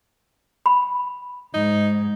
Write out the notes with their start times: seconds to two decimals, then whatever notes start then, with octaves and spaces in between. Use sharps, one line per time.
0.66 B5
1.54 G#2 D#4